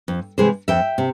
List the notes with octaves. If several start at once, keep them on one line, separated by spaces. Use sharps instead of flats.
F2
C3 E3 G#3 G#4 C5
F2 E5 G5
C3